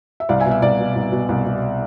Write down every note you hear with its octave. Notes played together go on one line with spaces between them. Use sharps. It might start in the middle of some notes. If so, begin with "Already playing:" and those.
E5
C2 D5 F5
E5 G#5
B2
E5
C2 D5
B2
C2
B2
C2
B2